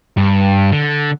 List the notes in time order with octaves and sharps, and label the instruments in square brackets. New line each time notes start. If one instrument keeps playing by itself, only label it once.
[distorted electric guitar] G2
D3